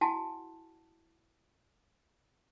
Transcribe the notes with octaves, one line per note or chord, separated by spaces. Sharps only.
E4 F#4 F#5 G#5 A5